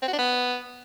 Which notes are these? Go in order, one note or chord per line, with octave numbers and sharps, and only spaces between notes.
C4
F#4
D4
B3